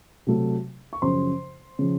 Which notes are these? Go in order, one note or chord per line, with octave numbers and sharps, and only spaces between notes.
C3 F#3 A3
C#6
F#2 C#3 F3 C5 C6
C#3 F3